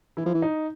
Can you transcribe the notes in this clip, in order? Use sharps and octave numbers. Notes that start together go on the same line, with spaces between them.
E3 E4
F3
E3
D#4